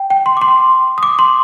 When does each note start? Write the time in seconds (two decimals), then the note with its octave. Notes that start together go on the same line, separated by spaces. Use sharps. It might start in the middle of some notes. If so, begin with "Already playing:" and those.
Already playing: G5
0.10 G5
0.26 C6
0.37 D6
0.41 C6
0.98 D#6
1.03 D6
1.19 C6